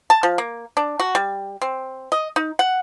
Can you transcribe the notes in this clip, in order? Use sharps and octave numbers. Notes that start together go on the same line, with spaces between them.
A5
F3
A#3
D4
F#4
G3
C4
D#5
D#4
F#5